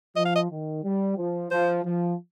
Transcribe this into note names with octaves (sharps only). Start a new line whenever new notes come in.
F3 D#5
F5
D#5
D#3
G3
F3
F3 C5
F3